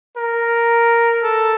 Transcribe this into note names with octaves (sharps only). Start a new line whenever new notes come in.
A#4
A4